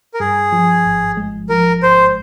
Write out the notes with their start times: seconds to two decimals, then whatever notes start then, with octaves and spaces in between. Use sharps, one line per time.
0.14 A#4
0.20 G2 G#4
0.52 F3
0.85 G#1
1.17 G#3
1.50 F3 A#4
1.83 G#1 C5